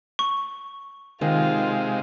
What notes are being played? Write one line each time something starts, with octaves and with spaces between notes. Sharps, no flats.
C#6
C3 D#3 G#3 F4 F5